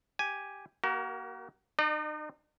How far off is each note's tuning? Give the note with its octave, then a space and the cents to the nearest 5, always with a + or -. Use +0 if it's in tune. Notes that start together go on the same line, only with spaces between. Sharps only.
G4 +0 G#5 +0
A#3 +25 F#4 +40 A#4 +0
D#4 -35 D5 +45